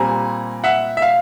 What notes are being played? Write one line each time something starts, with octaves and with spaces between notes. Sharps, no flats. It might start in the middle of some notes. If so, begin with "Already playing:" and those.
Already playing: A#2 G3 C4 G#5 A#5
E5 F#5
E5
F5